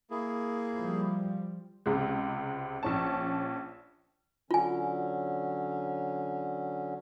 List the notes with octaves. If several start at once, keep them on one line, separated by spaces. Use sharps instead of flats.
A#3 E4 G#4
F3 G3
C#2 C3 G#3
A#1 C#4 A5
D3 F#3 C#4 F4 G#5